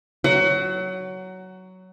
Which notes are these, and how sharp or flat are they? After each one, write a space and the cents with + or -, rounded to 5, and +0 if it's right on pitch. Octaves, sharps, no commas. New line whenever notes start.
F#3 +10 F#5 +30